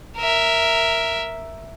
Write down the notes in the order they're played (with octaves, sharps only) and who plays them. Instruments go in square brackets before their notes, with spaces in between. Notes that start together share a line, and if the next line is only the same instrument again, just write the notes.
[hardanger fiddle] A#4 E5